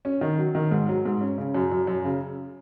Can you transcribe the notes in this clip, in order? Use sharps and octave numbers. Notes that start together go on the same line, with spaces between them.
C#4
D#3
F#3
D#3
G#2
F#3
G#2
C#4
C#3
F#2
F#2
F#2
C#3